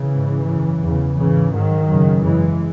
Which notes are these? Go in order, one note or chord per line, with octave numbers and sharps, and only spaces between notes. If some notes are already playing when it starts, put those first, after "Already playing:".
Already playing: C#3 E3
G#2
F#2 C#3
E2 C#3
G#2 C#3 E3
G#2 D#3 F#3
F#2 C#3
F#2 C#3 E3 G#3